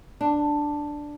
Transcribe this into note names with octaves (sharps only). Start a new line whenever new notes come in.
D4